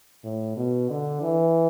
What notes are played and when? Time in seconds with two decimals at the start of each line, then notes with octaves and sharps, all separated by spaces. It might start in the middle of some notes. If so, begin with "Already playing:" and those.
0.24 A2
0.57 B2
0.90 D3
1.22 E3